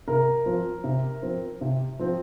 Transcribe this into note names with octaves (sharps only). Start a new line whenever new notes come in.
C3 A#4
F3 C4
C3
F3 C4
C3
F3 C4